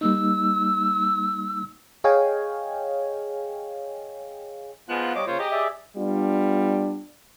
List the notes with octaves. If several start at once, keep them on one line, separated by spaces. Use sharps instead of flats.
G3 A#3 D#4 E6
G#4 C#5 D#5 F5 G5 G#5
G#2 F3 G#3 B3 F4 F#6
G3 C#5 D#5 D6
C#3 A#3 F4 C5 C#5
G4 G#4 D#5 A#5
G#4 D5 E5
G3 B3 D4 F4